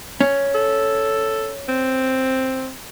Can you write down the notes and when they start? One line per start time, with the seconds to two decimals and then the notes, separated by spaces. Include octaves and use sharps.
0.21 C#4
0.55 A4
1.69 C4